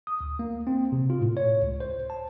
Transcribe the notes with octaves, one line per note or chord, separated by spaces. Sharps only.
D#6
D2
A#3
C4
C3
F4
A2
C#5
C#2
C5
A5